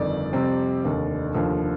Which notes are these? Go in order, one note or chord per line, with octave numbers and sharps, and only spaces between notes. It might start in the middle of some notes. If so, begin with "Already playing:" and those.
Already playing: G1 F2 D#3 D5
F2 C3 G3 C4
F1 D#2 D3
F1 D#2 D3 F3